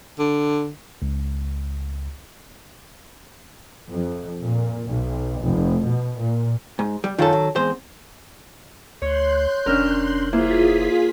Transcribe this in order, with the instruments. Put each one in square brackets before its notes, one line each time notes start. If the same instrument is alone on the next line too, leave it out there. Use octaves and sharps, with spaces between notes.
[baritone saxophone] D3
[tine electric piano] C#2
[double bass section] F2
A#2
B1
F1
B2
A#2
[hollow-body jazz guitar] G#2
G3
[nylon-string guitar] F#2 F4 [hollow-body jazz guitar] D#3 A4
[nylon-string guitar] F#3
[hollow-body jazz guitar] E2 C5 [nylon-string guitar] G#3 C4
[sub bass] D2 [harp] C#5 [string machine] C6 F#6 G6
[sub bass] F1 [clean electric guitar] C#4 D4 A#4 [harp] F6
[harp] A#3 [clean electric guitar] E4 C5 [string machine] F4 G#4 B6